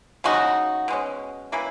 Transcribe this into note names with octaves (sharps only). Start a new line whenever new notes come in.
C#3 G#3 D#4 F#4
B2 G#3 C#4
E3 A#3 C#4 E4